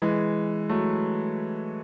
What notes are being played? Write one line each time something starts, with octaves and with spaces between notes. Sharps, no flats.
E3 G#3
F#3 A3